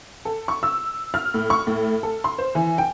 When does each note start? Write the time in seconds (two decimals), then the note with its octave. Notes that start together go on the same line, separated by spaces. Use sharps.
0.25 A4
0.48 C#6
0.63 E6
1.14 F6
1.34 A2
1.50 C#6
1.67 A2
2.03 A4
2.24 C6
2.38 C5
2.55 E3
2.78 G5